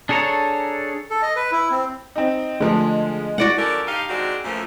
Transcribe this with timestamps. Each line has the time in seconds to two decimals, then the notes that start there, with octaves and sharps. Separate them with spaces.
0.09 D4 G#4 A4 C#5 A#5
1.10 A4
1.22 D#5
1.36 B4
1.52 E4
1.71 C4
2.16 C4 D#4
2.61 D3 F3 G#3 A3
3.38 G#3 E4 F#4 D5 F#5
3.57 F3 C#4 F#4 A4 A#4 D5
3.87 G2 D#4 G4 F5
4.09 D#3 G#3 C4 D4 F#4
4.44 F#2 A#2 E3 F3 A3